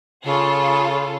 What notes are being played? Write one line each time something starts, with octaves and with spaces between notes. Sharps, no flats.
C#3 F4 G#4 A4